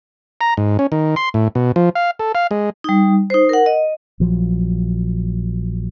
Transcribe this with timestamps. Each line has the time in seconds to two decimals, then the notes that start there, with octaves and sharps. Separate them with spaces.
0.41 A#5
0.57 G#2
0.79 C#4
0.92 D#3
1.16 C6
1.34 A2
1.55 B2
1.76 F3
1.95 F5
2.19 A4
2.35 F5
2.51 G#3
2.84 G3 D#4
3.30 D#4 C5
3.49 A#4 F#5
3.66 D#5
4.20 A#1 F3 F#3